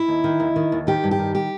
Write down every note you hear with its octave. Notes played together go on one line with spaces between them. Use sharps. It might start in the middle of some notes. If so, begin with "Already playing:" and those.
Already playing: E4
D#2
D#3
D#2
D#3
D#2
D#3 G4
G2
G4
D#3
G4